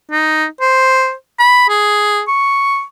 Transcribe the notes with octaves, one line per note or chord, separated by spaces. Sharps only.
D#4
C5
B5
G#4
C#6